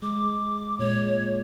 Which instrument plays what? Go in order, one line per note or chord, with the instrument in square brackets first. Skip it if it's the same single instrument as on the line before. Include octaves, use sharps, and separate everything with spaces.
[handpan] G#3 [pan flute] D6
[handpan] A#2 G#3 [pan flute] C#5